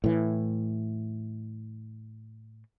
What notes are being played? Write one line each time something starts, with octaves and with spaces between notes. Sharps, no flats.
A2 E3